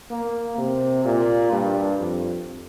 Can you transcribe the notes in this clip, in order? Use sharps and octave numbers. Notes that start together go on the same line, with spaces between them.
A#3
C3
A#2
G2
F2